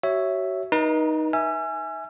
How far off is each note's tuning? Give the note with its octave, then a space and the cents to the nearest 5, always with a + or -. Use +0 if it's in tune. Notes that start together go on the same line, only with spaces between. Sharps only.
F#4 +35 C#5 +0 E5 +0
D#4 +0 B4 -45 A#5 +35
E5 -15 G#5 +0 E6 +45